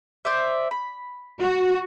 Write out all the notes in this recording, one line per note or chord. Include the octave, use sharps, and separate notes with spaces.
C5 D5 E5
B5
F#4